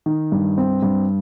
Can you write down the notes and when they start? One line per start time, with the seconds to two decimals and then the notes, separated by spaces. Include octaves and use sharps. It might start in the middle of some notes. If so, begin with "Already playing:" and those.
0.06 D#3
0.32 G2
0.58 C4
0.83 G2